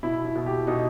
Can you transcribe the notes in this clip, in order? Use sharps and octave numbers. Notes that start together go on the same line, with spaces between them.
B2 E4
E4
B2
G4
B2 D#4